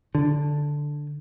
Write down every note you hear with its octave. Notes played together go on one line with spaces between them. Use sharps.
D3